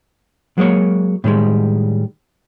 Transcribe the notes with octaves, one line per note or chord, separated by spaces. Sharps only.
F#3 G#3 A#3 C#5
A2 D#3 G3 G#3